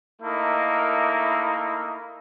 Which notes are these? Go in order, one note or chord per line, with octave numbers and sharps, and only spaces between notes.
A3 A#3 D#4 E4